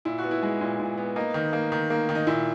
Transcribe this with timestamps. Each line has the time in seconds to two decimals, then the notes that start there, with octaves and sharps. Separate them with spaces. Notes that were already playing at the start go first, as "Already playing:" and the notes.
0.05 A#2 E4
0.19 B3 F#4
0.31 E4
0.42 G#3
0.61 A#2
0.79 A#2
0.98 B3
1.16 A#3 D#4
1.34 D#3
1.53 A#3
1.72 D#3
1.90 A#3
2.09 D#3
2.15 D#4
2.27 A#2 E4